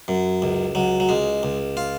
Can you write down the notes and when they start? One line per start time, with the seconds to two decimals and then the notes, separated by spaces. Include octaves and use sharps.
0.08 F#2
0.42 C#2
0.75 C#2 F#3
1.00 F#3
1.09 C#2 G#3
1.43 C#2
1.77 F4